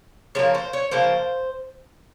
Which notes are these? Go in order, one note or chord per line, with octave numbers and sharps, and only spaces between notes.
C#3 F3 A#3 C#5
C5
C#5
C#3 F3 A#3 C5